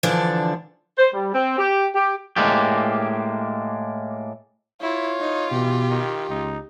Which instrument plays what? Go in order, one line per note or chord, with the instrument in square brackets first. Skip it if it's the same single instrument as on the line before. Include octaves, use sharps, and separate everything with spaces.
[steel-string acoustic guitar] D3 E3 F3 D4 D5
[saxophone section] C5
G3
C4
G4
G4
[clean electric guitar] A2 G#3 A#3 D4 G4
[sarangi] E4 [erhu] F4 [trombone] C#5
[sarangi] D#4
[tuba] B2 [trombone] E3 [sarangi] G4
[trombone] D#3
[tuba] C#2 [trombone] D#4